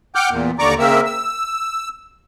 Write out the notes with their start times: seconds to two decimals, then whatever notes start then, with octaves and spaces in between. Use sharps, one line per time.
0.15 F#5 G5 D6 F6 G6
0.30 E2 A#2
0.59 D#2 D3 D5 A#5 C#6 D6
0.79 C#3 A#3 C4 A#4 E5 E6
1.05 E6